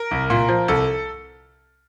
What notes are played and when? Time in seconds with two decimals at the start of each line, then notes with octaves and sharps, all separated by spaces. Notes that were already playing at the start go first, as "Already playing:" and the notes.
Already playing: A#4
0.11 C2
0.30 A#2
0.49 F3
0.68 C2 A4